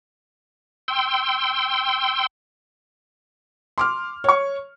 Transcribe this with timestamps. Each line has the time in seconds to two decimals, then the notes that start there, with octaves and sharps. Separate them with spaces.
0.88 G5 C6 E6
3.78 C6 D6 F6
4.24 C#5 C#6